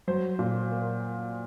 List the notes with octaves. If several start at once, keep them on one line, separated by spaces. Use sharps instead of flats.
F#3 C5
A#2
A#3